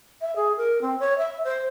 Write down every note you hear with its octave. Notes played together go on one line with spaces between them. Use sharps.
E5
G#4
A#4
C4
C#5
E5
C5